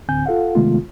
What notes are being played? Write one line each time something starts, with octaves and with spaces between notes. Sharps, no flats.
D2 A2 D3 C4 G#5 G6
F4 A4 F5 F#5
C3 D#3 G#3 A3 B3 F4